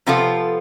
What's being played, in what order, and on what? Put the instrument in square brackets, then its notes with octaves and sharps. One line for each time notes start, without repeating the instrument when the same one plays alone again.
[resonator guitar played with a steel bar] C3 F3 B3 F4 A4